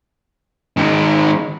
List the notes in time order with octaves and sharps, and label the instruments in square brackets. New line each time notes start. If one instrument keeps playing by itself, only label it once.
[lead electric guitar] G#2 D#3